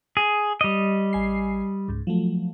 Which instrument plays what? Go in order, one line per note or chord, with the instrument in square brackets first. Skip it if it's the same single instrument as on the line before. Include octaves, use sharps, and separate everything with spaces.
[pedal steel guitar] G#4
G3 D#5
[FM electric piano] A1 G#5 C7
C#2 G#2
F3 F#3 A3